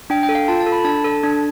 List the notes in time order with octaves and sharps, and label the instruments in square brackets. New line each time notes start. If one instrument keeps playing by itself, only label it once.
[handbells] D4 G5
G5
A4
F5
F4 A5
A5
A4
B5
D4 A5
A4
D4